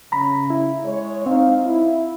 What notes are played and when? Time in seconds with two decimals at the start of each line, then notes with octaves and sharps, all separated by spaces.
0.12 C#3 A#5 B5
0.50 E4
0.86 G#3 C#5
1.26 C4 D#4 F5
1.65 E4